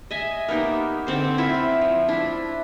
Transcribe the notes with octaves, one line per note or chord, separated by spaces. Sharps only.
D#5 E5 G#5
A#3 B3 D#4 G4
D3 C4 C5
E4 F4 E5
F3
D4 E4